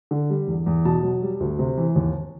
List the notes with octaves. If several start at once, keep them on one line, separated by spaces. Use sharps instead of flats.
D3
G3
E2
E2
B2 A5
F#3
G3
D2
C3
E3
D#2